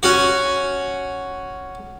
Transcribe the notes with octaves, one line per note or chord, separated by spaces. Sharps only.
C#4 F#4